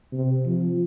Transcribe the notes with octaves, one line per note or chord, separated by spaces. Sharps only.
C3
F3